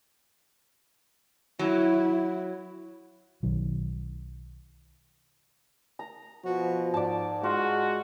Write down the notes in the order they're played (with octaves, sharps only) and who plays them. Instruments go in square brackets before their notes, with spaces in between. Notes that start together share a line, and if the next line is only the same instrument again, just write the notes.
[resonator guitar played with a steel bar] F#3 [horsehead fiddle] E4
[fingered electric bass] B1 D#3 F#3
[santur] A#5
[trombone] B2 [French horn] F3 [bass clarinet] F#4
[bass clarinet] G#2 [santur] D5 A5
[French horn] G#3 [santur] F4 [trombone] F#4